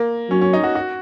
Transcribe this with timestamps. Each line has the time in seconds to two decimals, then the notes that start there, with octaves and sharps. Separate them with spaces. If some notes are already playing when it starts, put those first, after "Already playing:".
Already playing: A#3
0.30 F#3 C#4
0.41 C#4
0.53 D#4
0.64 F#4
0.75 F#4